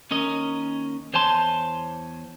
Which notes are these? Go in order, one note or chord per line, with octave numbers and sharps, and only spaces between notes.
D#2 C#4 A#4 D#5
E2 C5 C#5 G#5 A5 C6